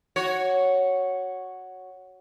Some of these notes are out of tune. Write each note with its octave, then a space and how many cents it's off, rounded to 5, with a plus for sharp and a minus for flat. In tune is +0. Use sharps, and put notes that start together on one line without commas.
F#4 +0 C#5 +0